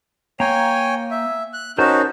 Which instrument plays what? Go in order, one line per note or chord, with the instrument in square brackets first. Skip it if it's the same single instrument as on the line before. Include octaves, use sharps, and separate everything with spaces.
[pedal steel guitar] A#3 A#5 [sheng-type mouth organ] C#5 G5 G#5
[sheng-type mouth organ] E5
F#6
[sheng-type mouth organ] C#4 D#4 F#4 [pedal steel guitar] A#4 C5 A5